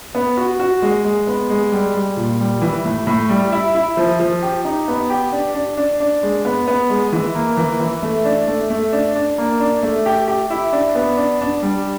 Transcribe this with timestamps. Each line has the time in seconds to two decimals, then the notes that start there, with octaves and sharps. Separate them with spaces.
0.15 B3
0.37 F#4
0.60 F#4
0.82 G#3
1.05 G#3
1.27 B3
1.50 G#3
1.72 G3
1.95 G3
2.17 A#2
2.40 G3
2.62 E3
2.85 A2
3.07 A2
3.29 G3
3.52 E4
3.75 E4
3.97 F3
4.20 F3
4.42 G4
4.65 D#4
4.88 B3
5.10 G4
5.32 D4
5.55 D4
5.77 D4
6.00 D4
6.23 G#3
6.45 B3
6.68 B3
6.90 G#3
7.13 E3
7.35 A#3
7.57 E3
7.80 E3
8.03 A3
8.25 D4
8.48 A3
8.70 A3
8.93 D4
9.15 D4
9.38 A#3
9.60 D4
9.83 A3
10.06 G4
10.28 G4
10.50 E4
10.73 D4
10.95 B3
11.17 D4
11.41 D4
11.62 G3